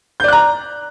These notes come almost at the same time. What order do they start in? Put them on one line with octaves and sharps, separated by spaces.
G6 D5 F#6 A#5